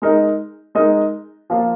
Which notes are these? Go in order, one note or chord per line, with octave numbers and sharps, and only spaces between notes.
G#3 D#4 A#4 D#5
G#3 D#4 A#4 D#5
F3 A#3 F4